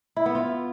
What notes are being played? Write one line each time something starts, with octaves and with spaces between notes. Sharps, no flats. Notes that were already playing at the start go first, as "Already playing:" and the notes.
E4
B3
F4